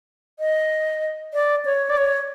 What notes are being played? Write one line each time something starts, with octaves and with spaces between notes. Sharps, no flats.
D#5
D5
C#5
D5
C#5